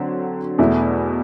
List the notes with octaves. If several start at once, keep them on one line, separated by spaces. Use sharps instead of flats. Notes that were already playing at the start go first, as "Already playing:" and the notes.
Already playing: D3 F#3 C4
E2 B2 A3 E4